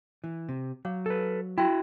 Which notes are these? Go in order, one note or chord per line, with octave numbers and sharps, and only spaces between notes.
E3
C3
F#3 C#5 F5 D6
A4 B4
E4 F#4 G5 A5 C6